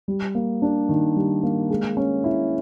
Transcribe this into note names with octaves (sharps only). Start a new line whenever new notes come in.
G3
A#3
D4
D#3
G3
A#3
G#3
C#4
E4